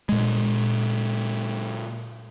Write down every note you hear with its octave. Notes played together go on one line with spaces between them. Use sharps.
A#2 G#3